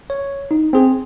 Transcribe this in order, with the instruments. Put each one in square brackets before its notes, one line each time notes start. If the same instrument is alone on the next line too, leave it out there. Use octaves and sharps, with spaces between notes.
[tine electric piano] C#5
D#4
C4 G#4